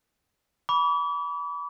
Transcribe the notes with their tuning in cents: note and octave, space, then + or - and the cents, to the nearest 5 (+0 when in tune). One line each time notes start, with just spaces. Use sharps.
B5 -15 D6 -40